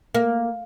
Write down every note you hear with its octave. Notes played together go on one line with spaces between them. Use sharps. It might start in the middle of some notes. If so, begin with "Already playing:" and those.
A#3